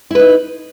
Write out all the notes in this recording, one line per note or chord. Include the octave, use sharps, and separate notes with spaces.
D#4 E4 B4